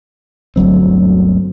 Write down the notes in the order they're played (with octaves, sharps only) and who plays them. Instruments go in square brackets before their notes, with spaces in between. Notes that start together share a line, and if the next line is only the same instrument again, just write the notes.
[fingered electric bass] G1 D2 F#3 C4